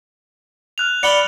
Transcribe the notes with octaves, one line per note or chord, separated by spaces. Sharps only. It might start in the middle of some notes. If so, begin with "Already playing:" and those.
F6 F#6 F7
D5 F#5 B5 C#7 G7